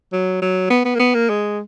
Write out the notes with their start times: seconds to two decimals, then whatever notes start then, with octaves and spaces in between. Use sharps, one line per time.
0.12 F#3
0.42 F#3
0.70 B3
0.85 B3
0.95 A#3
0.99 B3
1.14 A#3
1.29 G#3